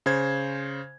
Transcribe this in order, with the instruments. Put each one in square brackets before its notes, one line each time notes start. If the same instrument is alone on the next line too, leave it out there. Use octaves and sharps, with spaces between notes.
[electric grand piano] C#3 C5 G#6